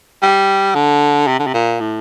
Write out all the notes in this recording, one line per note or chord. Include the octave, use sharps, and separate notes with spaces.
G3
D3
C3
D3
C3
A#2
A2